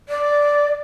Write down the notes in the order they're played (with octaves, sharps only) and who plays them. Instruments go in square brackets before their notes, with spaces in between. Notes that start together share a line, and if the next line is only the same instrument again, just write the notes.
[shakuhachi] D5